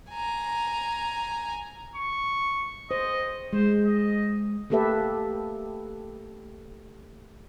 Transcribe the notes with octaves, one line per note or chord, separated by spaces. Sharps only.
G#5 A#5
C#6
C5 D#5
G#3 C5
D#5
A3 A#3 G4 A4 B4 E5